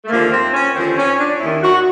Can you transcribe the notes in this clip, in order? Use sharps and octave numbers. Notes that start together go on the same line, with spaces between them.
A3
D#2 D3 F3 A#3
C4
C#4
D#2 D3 F3 C4
C#4
D4
D#2 D#3 E4
F#4